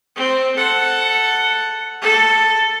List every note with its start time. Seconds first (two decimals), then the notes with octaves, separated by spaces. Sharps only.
0.16 C4
0.57 A4 F#5
2.02 A4